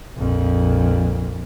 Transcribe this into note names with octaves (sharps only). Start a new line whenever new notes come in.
A#1 F2